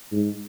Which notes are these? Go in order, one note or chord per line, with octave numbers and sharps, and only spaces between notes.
G#2